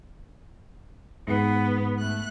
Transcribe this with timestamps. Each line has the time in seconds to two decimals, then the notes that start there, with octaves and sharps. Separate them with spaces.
1.28 G#2 B3
1.98 A3 F#6